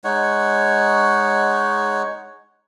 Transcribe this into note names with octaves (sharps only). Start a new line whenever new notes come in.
G#3 D#4 C#5 F#5